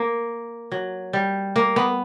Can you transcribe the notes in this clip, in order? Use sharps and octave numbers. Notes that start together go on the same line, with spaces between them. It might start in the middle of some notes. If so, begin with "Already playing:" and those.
Already playing: A#3
F#3
G3
A#3
B3